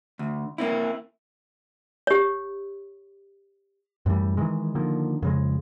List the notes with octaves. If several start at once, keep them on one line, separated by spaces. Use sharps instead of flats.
D2
A#3 C4 E4
G4 C#5
F#2 A2 E3 G3
D#3 E3 G#3
D3 D#3 F3 A#3
F2 C#3 G#3